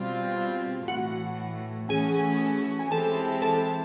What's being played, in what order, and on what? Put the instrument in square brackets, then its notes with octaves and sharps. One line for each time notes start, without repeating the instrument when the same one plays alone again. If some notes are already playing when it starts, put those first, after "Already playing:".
Already playing: [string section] B2 G3 C4 F4
[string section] A2 E3 A3 [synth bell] F#4 F#5
[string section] E3 A3 C#4 F#4 [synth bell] G#4 G#5
[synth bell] G#5
[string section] E3 G#3 C4 E4 G4 [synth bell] A4 A5
[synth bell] A4 A5